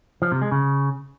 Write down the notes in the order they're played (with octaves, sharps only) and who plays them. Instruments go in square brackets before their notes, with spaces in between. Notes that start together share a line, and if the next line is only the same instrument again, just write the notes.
[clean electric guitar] F3
C3
G#3
C#3